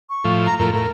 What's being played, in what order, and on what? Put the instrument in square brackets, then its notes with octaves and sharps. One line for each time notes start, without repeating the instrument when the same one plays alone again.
[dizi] C#6
[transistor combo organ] A2 F3
[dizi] A#5
[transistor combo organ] F2 A2 [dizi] A#4
[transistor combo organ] A2 [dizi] A#4